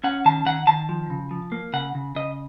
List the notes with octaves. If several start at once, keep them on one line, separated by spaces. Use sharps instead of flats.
C#4 F#5
D#3 A5
D#3 F#5
D#3 A5
F3
C#3
F3
A#3
C#3 F#5
C#3
C#3 D#5